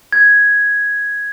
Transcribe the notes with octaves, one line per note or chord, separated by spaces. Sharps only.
G#6